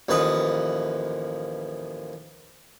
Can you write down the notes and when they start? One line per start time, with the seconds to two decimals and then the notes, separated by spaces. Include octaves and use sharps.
0.09 A1 D#2 F3 B4 D#5